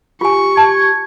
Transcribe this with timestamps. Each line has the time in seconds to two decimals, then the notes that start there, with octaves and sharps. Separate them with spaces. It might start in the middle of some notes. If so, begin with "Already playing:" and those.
0.21 F4 G4 G#5 C#6
0.57 A5 G#6